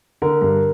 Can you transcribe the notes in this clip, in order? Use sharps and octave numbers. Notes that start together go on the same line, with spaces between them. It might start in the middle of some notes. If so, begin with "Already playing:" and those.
D3 A#4
G2 A#4